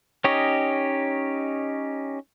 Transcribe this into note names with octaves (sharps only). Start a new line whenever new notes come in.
C#4 D#4 G4 C#5 D#5